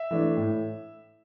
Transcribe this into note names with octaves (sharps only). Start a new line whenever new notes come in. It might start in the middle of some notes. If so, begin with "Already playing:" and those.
Already playing: E5
E3 A3 D4
A2